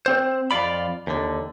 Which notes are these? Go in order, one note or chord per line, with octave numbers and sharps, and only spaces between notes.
C4 C5
F2 G#2 F4 D5 B5
D#2 D3